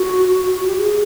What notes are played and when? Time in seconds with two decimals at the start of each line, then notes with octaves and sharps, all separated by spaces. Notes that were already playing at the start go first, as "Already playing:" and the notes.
Already playing: F#4
0.57 F#4
0.67 G4
0.78 G#4